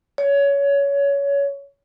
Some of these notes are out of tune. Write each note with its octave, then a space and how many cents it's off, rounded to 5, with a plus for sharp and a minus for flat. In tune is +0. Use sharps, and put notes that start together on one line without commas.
C#5 +20